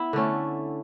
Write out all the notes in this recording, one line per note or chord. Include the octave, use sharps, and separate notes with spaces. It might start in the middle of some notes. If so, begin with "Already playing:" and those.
Already playing: B3 E4
D3 A3 C#4